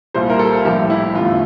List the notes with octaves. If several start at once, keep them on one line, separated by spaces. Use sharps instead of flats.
C2 A#2 G3 C5
A#4
A4
A#1 A2 G3 G4
E4
E2 D3 A3 F4